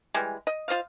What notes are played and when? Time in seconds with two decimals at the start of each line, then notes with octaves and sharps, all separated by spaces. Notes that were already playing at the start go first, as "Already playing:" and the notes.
0.14 E3 G3 G#3
0.47 D#5
0.68 F4 C5 D#5 F5